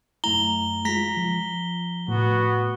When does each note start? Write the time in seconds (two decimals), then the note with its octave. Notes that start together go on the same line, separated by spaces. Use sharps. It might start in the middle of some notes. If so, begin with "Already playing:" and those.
0.24 F#2 A3 E4 A#5 G7
0.85 G#3 F4 A#5 A#6 B6
1.17 F3
2.08 A2 B3 F#4